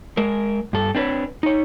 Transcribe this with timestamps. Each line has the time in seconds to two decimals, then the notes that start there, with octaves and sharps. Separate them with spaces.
0.17 G#3 A#4
0.73 G2 A4
0.95 C4 D4 B4 C#5
1.43 D#4 C#5